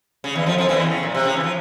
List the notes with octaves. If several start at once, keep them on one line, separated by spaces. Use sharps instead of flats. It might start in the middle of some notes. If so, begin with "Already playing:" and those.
C#3
E2 E3
F2 F3
F2 F3
E2 E3
C#3
A#2
C3
C#3
E3
F3